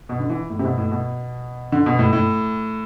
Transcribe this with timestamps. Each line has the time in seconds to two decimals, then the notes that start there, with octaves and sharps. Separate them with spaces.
0.09 B2
0.20 D3
0.30 E3
0.50 A2
0.59 C3
0.64 B2
0.78 A2
0.91 B2
1.72 D3
1.86 B2
1.99 A2
2.13 A2